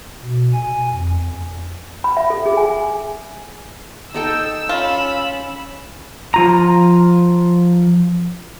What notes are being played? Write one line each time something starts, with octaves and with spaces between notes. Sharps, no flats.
B2
G#5
F2
B5
E5
A4
G#4
G#5
D#4 A4 G5 E6
C#4 F4 B5
F3 F4 A#5